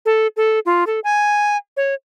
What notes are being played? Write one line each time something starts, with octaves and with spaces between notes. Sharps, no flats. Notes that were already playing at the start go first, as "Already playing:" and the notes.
A4
A4
F4
A4
G#5
C#5